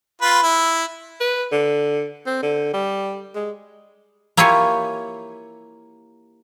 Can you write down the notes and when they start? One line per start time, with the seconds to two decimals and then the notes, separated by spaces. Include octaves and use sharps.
0.22 F4 B4
0.43 E4
1.21 B4
1.52 D3
2.27 C4
2.43 D3
2.74 G3
3.35 G#3
4.37 A#3 E4 F4 G4 C#5 G#5